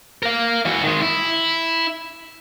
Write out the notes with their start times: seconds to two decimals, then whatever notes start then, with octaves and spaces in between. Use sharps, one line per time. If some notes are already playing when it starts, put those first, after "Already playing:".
0.23 A#4 F5
0.65 E3 F#4
0.83 D#3 G#3
1.01 E4